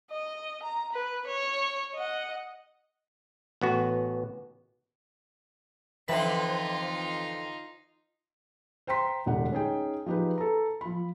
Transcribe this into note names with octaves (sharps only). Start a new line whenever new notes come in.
D#5
A#5
B4
C#5
D#5 F#5
A1 B3 F#4
F2 D3 E3 C4 D#4 F4 B4 B6
C5 G5 A#5 C6 B6
E1 D2 G4 F#5
C#4 D#4 G#4 G5
F3 D#4 G4 G#4 B4
A4 A#5
F3 B5